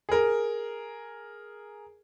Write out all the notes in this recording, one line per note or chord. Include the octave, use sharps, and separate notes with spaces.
G#4 A#4